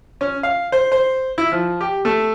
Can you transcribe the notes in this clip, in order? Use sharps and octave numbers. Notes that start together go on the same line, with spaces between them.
C#4
F5
C5
C5
E4
F3
G4
A3